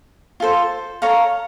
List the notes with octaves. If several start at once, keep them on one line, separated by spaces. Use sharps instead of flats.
F4 A4 C5
A4 C#5 F5 A#5